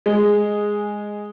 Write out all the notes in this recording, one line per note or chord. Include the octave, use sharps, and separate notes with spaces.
G#3